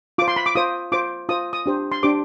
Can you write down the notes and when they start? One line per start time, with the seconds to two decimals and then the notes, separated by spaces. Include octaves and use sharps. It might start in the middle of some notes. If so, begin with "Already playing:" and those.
0.18 F4 D6
0.22 C5
0.28 C6
0.36 B5
0.46 D6
0.55 F4 C5 D#6
0.92 F4 C5 D6
1.29 F4 C5 D#6
1.53 D#6
1.66 D4 G4 C5
1.92 C6
2.03 D4 G4 C5 D6